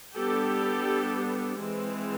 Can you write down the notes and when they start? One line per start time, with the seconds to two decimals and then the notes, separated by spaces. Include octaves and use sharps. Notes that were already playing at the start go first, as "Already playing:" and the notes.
0.15 G3 B3 D4 G4 A4
1.60 E3 G#3 C4